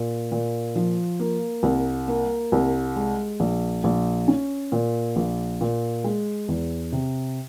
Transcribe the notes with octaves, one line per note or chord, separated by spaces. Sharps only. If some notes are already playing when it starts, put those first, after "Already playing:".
Already playing: A#2
A#2
F3
A#3
C2
A#3
C2
G#3
A#1
A#1
C#4
A#2
A#1
A#2
G#3
E2
C3